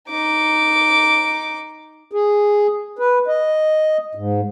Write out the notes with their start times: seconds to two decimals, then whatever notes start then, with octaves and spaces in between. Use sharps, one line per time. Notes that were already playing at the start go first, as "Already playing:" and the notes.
0.10 D#4 D6
2.12 G#4
2.99 B4
3.28 D#5
4.15 G#2